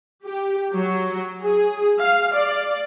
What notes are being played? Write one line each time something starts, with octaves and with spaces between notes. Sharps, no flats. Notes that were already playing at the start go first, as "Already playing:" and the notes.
G4
F#3
G#4
F5
D5